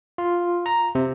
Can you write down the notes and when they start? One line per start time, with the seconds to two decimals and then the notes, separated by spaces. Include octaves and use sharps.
0.18 F4
0.66 A#5
0.95 C3